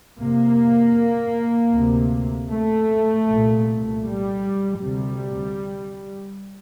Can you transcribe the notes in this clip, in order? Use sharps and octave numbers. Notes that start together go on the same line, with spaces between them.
F2 C3 A#3
D2 C3
A3
C2 A#2
G3
D2 C3 G3